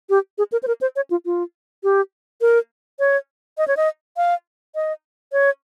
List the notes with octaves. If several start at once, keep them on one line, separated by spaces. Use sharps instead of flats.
G4
G#4
A#4
C5
A#4
C5
C#5
F4
F4
G4
A#4
C#5
D#5
C#5
D#5
F5
D#5
C#5